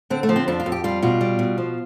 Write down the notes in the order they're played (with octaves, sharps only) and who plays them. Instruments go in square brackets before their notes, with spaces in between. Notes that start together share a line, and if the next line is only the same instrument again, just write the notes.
[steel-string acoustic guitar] D3 C4
A3
F3
C4
F2 D4
F4
F2
G4
G3 F4
B2 F4
G3
B2
F3